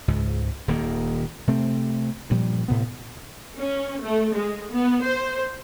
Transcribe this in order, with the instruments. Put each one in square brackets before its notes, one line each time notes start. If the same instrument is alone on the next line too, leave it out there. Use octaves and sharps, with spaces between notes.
[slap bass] C#2 G#2
D#1 D#3 A#3
C3 A3 C4
G2 A#2 F3 G3
A2 C3 B3
[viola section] C#4
A3
G#3
B3
C5